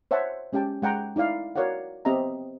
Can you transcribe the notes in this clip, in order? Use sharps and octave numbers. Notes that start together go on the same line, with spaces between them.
C5 C#5 E5 F#5 A5
G#3 C#4 G4 G5 A5
G#3 F#5 G5 A#5
D#4 E4 D5 F5
F#4 A#4 C#5 D5 F5 F#5
B3 C4 G4 D#5 E5 A#5